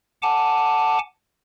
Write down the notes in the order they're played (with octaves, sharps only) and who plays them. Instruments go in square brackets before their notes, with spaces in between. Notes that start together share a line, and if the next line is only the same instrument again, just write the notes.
[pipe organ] F#5 G#5 A5 D6